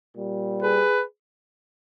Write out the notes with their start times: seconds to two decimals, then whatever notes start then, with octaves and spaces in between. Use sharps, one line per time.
0.16 A#2 G3
0.62 G#4 B4